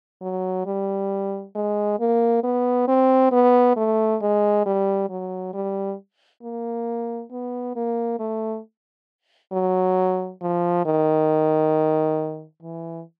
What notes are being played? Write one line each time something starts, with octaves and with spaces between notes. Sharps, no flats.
F#3
G3
G#3
A#3
B3
C4
B3
A3
G#3
G3
F#3
G3
A#3
B3
A#3
A3
F#3
F3
D#3
E3